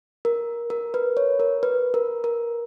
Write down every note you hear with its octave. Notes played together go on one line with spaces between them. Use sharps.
A#4
A#4
B4
C#5
A#4
B4
A#4
A#4